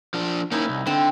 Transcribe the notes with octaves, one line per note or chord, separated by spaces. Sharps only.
F3 D4
A#3 C#4 D#4 E4
C2
D3 C4